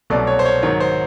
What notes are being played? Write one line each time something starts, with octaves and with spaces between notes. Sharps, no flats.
C2 B2 F#3 A3 D5
C#5
C5
C#5
G#2 D#3 F#3 C#5
C5